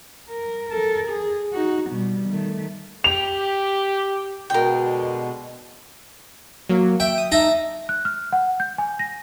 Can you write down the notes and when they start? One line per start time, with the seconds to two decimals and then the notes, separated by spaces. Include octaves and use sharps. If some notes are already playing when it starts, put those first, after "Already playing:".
0.29 A#4
0.70 A4 A#4
1.08 G#4
1.53 D#4 F#4
1.91 B2 G3
2.29 D#3 A3
3.04 G4 F7
4.50 B2 D3 G#3 A#4 G5
6.69 F#3 A#3
7.00 E5 G5
7.18 D#6
7.32 D#4 E5 A5 A#5
7.89 F#6
8.05 F6
8.33 F#5
8.60 G6
8.78 G#5
8.99 A#6